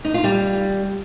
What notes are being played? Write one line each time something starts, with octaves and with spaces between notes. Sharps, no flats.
D#4
F4
G3